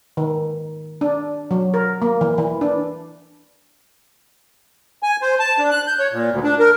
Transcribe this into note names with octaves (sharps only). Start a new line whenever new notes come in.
D#3
D4
F#3
A#4
A#3
E3
E3
D4
G#5
C5
A5
D4
F#6
G6
C#5
A#2
D2
D4
A#4